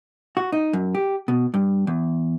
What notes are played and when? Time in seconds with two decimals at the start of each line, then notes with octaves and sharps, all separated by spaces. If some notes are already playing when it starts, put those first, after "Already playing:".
0.37 F#4
0.52 D#4
0.73 F#2
0.95 G4
1.28 B2
1.54 G2
1.87 E2